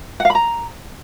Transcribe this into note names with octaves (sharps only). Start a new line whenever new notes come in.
F#5
F5
B5
A#5